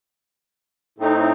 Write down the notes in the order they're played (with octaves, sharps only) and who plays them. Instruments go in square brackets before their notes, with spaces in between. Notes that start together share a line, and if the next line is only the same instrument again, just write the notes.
[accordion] A2 A3 C4 D#4